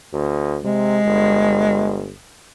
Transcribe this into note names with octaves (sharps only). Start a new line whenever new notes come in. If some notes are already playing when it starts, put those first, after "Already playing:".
D2
C3 G#3
G1